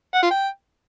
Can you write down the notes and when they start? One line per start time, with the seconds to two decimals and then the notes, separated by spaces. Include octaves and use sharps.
0.14 F#5
0.23 F4
0.31 G5